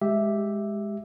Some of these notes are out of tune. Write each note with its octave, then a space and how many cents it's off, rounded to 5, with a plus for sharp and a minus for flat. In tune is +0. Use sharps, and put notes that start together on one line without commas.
G#3 +0 G4 +0 E5 +0